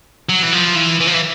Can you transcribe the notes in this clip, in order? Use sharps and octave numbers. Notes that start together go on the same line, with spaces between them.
F#3
E3
F3
E3
E3
F3
E3